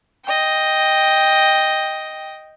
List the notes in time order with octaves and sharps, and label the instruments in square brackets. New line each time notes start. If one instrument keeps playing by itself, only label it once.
[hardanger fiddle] D#5 G5